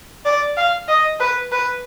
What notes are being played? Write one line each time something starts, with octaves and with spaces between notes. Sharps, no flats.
D5
F5
D#5
B4
B4